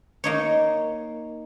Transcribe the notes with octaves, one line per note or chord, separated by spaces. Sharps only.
A#3 D#4 C#5